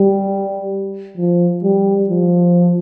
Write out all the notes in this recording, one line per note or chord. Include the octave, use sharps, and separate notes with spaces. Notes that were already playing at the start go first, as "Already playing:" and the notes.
Already playing: G3
F3
G3
F3